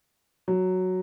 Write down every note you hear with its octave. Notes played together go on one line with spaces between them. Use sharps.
F#3